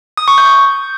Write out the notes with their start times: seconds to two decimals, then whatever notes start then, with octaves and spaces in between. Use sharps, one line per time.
0.17 D#6
0.28 C#6
0.38 G6